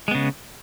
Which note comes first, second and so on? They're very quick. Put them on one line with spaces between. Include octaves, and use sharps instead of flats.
G#3 B3 C#3